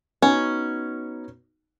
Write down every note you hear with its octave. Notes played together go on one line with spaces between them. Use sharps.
B3 C#4 D#4 F#4